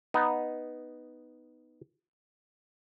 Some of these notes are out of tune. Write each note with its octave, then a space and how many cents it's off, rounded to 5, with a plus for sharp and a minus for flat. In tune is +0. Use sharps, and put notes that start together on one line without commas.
B3 +0 D#4 +0